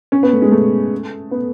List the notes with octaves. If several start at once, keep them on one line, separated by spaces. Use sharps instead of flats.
C#4
B3
A3
G#3
A3
B3